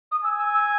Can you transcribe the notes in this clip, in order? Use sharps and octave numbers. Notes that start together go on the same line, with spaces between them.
D#6
G#5 E6
E6
E6